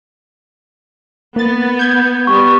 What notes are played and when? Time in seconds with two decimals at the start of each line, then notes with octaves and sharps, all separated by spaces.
1.36 A#3 B3 A6
1.79 G6 G#6
2.27 G3 B3 C#6